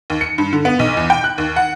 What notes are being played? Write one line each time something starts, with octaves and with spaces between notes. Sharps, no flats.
D#2
C#7
G2
D3
B3
B1
E2
G5
F#6
D#2
F#5